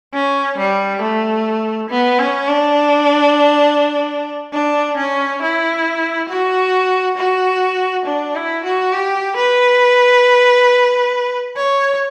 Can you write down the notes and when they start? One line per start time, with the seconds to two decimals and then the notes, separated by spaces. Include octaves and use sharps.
0.14 C#4
0.58 G3
1.01 A3
1.89 B3
2.19 C#4
2.48 D4
4.53 D4
4.97 C#4
5.42 E4
6.29 F#4
7.17 F#4
8.05 D4
8.35 E4
8.64 F#4
8.93 G4
9.37 B4
11.57 C#5